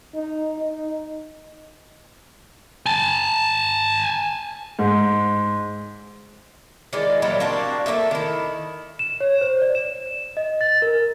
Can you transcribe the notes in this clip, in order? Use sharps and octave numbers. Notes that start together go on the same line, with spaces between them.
D#4
D#4
G#5 A5
G#2
D#3 E3 G#3 D5
A#2 F#3 G3 E4
A#3 C4 D4 F#4
A3 A#3 D#5 E5
D#3 E4
E7
C#5
C5
D5
E7
D#5
A6
A#4